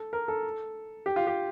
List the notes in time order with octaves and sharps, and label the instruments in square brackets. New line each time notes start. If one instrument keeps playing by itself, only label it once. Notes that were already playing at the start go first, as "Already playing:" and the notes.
Already playing: [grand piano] A4
A#4
A4
G4
F4
G4